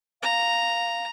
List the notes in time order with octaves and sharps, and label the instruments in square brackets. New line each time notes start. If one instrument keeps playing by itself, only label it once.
[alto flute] F5 [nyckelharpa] A#5